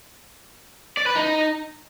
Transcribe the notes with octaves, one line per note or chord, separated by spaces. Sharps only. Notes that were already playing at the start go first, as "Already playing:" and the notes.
D5
B4
D#4